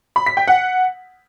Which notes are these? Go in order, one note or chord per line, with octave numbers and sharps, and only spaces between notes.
B5
B6
G5
F#5